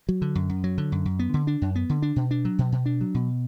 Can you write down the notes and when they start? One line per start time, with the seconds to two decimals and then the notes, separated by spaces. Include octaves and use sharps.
0.09 F#3
0.22 D3
0.35 F#2
0.50 F#2
0.64 F#3
0.78 D3
0.92 F#2
1.05 F#2
1.19 B3
1.34 D3
1.47 D4
1.62 F#2
1.76 B3
1.89 D3
2.02 D4
2.16 B2
2.31 D4
2.45 F#3
2.59 B2
2.72 B2
2.86 D4
3.01 F#3
3.14 B2